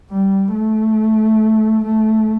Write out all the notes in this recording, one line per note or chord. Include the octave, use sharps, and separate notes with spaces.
G3
A3
A3